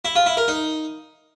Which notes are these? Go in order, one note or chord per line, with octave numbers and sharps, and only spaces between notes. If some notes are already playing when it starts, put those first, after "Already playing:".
E4
F4
E4
A#4
D#4